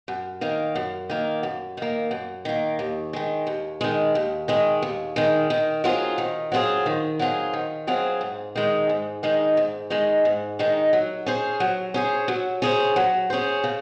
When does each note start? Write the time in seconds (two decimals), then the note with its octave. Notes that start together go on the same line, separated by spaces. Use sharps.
0.08 F#2
0.41 D#3 A#3
0.75 F#2
1.10 D#3 A#3
1.43 F#2
1.77 D#3 A#3
2.11 F#2
2.45 D#3 A#3
2.79 D#2
3.13 D#3 G#3
3.47 D#2
3.81 D#3 G#3
4.15 D#2
4.48 D#3 G#3
4.82 D#2
5.16 D#3 G#3
5.50 D#3
5.84 F#3 C4 F4 G#4
6.18 D#3
6.52 F#3 C4 F4 G#4
6.86 D#3
7.19 F#3 C4 F4 G#4
7.53 D#3
7.87 F#3 C4 F4 G#4
8.21 G#2
8.56 D#3 G#3 D#4
8.89 G#2
9.23 D#3 G#3 D#4
9.57 G#2
9.90 D#3 G#3 D#4
10.25 G#2
10.59 D#3 G#3 D#4
10.93 F#3
11.26 C#4 G#4 C5
11.60 F#3
11.94 C#4 G#4 C5
12.28 F#3
12.62 C#4 G#4 C5
12.96 F#3
13.30 C#4 G#4 C5
13.64 C#3